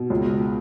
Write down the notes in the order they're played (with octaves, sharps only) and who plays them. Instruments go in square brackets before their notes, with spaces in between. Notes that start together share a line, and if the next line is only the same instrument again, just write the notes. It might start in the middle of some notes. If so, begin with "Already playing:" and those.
Already playing: [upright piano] B2
C#2